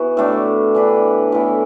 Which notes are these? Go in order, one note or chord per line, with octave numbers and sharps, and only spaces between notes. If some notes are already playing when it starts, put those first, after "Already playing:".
Already playing: E3 B3 E4 F#4
A2 A3 D4
E3 D4 B4
A2 E3 B3